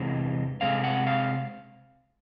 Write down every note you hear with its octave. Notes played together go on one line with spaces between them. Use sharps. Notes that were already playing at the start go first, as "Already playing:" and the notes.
Already playing: E2 C3 E3 G#3 C5
C3 D#3 G#3 C4 F5
F#5
F5